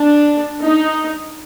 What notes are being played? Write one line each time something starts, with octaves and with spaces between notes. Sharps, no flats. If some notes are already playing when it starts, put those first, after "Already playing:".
Already playing: D4
D#4